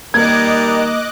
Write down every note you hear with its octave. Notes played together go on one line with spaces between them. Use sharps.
D#3 G3 A#3 A#4 D#5 D6 F#6 G#6